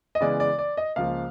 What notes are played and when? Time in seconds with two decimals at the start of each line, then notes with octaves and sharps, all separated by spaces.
0.15 D#5
0.21 C#3 E3 G#3 B3 D5
0.40 D5
0.59 D5
0.77 D#5
0.96 C#2 C#3 F3 A#3 F5